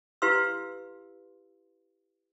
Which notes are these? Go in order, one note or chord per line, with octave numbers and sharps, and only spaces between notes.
E4 G4 B4 F5 C6 E6